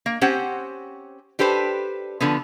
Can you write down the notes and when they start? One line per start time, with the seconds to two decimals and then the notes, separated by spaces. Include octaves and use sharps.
0.06 A#3
0.21 C4 C#4 G4 C5 F#5
1.39 D4 G4 A4 B4 C5
2.21 D3 F3 B3